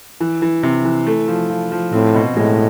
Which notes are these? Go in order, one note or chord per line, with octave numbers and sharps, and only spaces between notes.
E3
E3
C3
E3
A3
F3
F3
F3
A2 C4
B2
A2 G#3